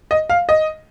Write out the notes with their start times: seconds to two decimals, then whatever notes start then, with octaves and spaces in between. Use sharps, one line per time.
0.11 D#5
0.30 F5
0.49 D#5